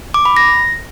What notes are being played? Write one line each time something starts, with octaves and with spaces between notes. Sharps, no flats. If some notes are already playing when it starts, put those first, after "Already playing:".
D6
B5
A#6